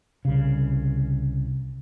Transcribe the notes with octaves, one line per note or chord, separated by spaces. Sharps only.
C2 C#3